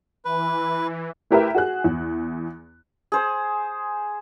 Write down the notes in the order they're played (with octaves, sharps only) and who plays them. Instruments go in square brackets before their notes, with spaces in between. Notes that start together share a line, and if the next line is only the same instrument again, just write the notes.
[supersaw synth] E3 [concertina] B4
[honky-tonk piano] A3 E4 G4 A#4 B4 E5
F#4 G#4 F#6
E2
[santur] G#4 C5